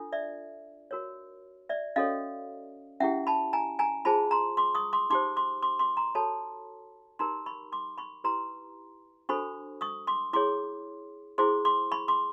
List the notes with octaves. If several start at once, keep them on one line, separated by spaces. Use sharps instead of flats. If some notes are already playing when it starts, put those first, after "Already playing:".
Already playing: D4 F4 A4
D5 E5
F#4 A#4 C#5
D5 E5
C#4 F#4 A4 C#5 D#5 F5
C#4 E4 G4 E5 F#5
A5 B5
G#5 A#5
G#5 A#5
F4 G#4 C5 A5 B5
A#5 C6
C6 D6
C#6 D#6
C6 D6
D#4 G4 C5 C6 D6
C6 D6
C6 D6
C6 D6
A#5 C6
F#4 A4 C#5 A5 B5
D#4 G4 A#4 A#5 C6
B5 C#6
C6 D6
B5 C#6
E4 G4 B4 A#5 C6
D4 F#4 A4 C5 B5 C#6
C#6 D#6
C6 D6
E4 G#4 C#5 C6 D6
E4 G#4 C5 C6 D6
C6 D6
B5 C#6
C6 D6